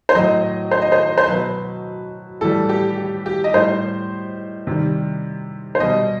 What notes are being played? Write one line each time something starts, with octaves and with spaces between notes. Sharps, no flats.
C5
A2 F#3 D#5
C5
D#5
C5
C5
B2 F#3 B4
A2 E3 G3 A4
G4
G4
G4
D#5
A2 G3 C5
C3 D#3 G3
C5
B2 G3 D#5